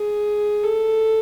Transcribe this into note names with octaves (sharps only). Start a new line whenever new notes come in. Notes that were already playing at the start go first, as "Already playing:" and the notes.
Already playing: G#4
A4